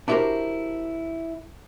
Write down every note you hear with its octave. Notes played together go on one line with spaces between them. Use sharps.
D4 E4 F#4 G4 A#4 C5